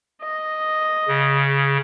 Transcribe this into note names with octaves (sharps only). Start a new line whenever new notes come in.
D#5
C#3